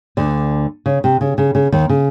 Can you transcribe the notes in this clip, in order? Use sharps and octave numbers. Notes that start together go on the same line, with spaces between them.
D2 D3
C#3
C3
C#3
C#3
C#3
D#2 D#3
C#3